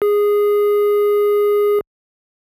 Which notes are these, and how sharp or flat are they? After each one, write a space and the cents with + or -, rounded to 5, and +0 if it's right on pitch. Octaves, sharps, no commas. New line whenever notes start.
G#4 -10